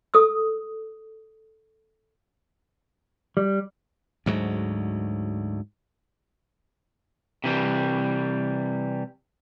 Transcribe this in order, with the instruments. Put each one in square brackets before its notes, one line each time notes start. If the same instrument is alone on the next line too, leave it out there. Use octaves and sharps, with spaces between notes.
[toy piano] A4 D#6 E6
[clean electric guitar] G3
[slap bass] D2 G#2 F#3
[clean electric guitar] C3 E3 G3